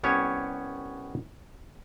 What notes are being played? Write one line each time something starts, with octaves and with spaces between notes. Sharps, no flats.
C2 B3 C#4 G4 C#5